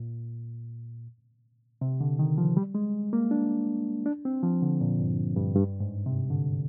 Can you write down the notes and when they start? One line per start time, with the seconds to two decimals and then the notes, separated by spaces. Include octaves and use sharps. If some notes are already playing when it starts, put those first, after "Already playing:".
Already playing: A#2
1.81 C3
2.01 D3
2.19 D#3
2.38 F3
2.57 G3
2.75 G#3
3.13 A#3
3.31 D4
4.06 D4
4.25 C4
4.43 F3
4.62 D3
4.81 A#2
5.00 G2
5.36 G2
5.56 G2
5.80 G#2
6.06 C3
6.30 D3